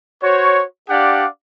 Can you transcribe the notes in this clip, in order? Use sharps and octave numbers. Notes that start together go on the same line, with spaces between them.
F#4 C5 C#5
D4 G4 D5 F5 F#5